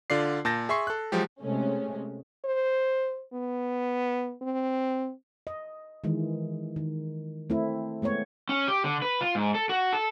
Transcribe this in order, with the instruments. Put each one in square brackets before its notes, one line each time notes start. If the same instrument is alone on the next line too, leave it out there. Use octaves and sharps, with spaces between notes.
[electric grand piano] D3 F4 D5 C7
A#2 A5 G6 A6 A#6
G#4 E5 C6 C#6 C7
A4 F#6
F3 F#3 G#3 G4
[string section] C3 G#3 A3 C#4
[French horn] C5
B3
C4
[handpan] D#5
D#3 E3 G#3
D#3
A3 C4 E4
G#3 A3 B3 C#5
[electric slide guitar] C#4
G4
D3
B4
F4
G#2
A4
F#4
A4